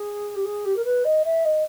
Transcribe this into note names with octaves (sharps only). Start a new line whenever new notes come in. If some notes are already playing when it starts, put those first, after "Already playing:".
Already playing: G#4
G4
G#4
G4
A#4
B4
D#5
E5
D#5